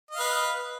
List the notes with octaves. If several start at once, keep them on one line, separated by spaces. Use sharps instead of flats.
B4 D#5 F5